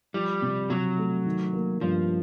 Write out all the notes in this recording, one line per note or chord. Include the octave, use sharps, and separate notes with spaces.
F3 G3
C3
C3 F#3
A3
D#3
A#3
G2 F3